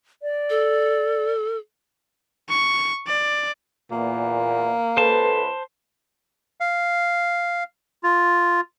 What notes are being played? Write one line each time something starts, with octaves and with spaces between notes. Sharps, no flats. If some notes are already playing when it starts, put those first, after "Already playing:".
D5
A4
C#6
D5
E2 A#2 A#3
C#2 A4 B4 C5 A5
F5
F4